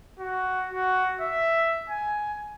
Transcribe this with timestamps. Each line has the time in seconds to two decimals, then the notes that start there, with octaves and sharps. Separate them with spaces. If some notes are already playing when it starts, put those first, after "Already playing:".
0.19 F#4
0.73 F#4
1.20 E5
1.90 G#5